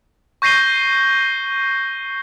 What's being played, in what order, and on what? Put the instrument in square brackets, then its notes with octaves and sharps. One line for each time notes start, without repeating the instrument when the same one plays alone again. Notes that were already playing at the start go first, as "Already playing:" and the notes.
[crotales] C#6 G6 A#6 C7 D#7 G7